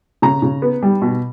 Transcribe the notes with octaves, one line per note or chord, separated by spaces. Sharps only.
C#3 A#5
C#3
B3
G3
B2